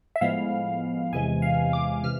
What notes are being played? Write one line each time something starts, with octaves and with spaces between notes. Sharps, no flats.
E5
A2 F3 G#3 B3 F5
E2 C3 E3 G#3 G#5
F5
D6
C3 E3 F6